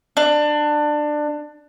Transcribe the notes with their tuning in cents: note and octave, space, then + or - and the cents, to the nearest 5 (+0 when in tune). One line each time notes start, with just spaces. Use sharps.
D4 +20